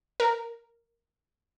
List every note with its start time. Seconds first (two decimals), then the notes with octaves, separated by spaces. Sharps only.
0.20 A#4